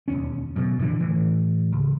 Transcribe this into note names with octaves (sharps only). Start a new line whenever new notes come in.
E1 D#2 C#4
F#2 B2
A#2 D3 E3
A2 E3
C#2